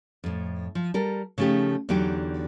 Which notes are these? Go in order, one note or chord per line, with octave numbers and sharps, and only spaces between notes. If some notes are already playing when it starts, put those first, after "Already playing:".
F2 A2
F3
G3 A4 A#4
C#3 F3 A3 D#4 G4
E2 D3 F#3 D#4 G4 G5